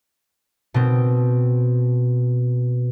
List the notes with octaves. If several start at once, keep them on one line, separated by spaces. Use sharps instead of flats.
B2 C4